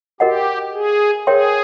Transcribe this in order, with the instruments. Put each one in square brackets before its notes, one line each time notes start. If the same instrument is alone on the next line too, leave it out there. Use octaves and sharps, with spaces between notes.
[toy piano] F#4 A#4 D#5 F#5 [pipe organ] G4
[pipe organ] G#4
[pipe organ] G#4 [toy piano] A#4 C#5 E5 G5 C6